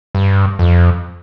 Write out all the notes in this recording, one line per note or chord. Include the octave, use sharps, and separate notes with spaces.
G2
F2